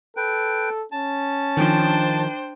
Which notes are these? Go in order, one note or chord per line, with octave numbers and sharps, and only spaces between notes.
A4 B4 G5
C#4 A5
D#3 F3 D4 C5 G5